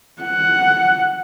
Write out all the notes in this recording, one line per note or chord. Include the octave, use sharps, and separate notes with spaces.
F#5